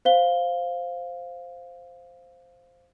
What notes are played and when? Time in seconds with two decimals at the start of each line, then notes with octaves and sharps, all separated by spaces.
0.05 C5 F5 G7